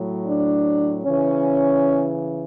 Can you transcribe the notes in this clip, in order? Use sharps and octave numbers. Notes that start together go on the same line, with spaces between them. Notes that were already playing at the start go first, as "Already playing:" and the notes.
Already playing: A2 F#3
D4
C#3 E3 C#4